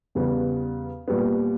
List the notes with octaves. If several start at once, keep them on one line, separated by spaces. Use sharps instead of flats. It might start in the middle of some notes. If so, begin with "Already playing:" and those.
E2 C#3 G3 B3
A#2 G3 B3